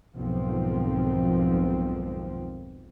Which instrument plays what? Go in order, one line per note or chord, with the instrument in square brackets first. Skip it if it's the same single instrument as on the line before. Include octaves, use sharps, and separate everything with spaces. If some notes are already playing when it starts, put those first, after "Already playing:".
[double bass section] B1 F2 G#2 D#3 F3 C4